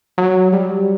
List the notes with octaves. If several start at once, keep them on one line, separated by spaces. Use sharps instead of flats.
F#3
G3